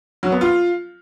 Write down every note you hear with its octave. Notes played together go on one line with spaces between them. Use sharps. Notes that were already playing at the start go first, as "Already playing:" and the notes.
F#3
B3
F4